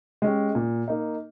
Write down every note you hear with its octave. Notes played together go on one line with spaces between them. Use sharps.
G#3 C#4 G4
A#2
A#3 D#4